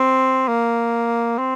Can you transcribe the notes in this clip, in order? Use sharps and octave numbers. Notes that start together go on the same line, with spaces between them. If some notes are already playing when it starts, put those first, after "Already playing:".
Already playing: C4
A#3
C4